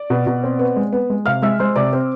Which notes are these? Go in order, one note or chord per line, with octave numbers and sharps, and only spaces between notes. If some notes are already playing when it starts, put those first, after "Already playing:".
Already playing: D5
B2
B2
C4
B3
G#3
B3
G#3
C3 F5 F6
G#3 E5 E6
G#3 C5 C6
C3 D5 D6
C4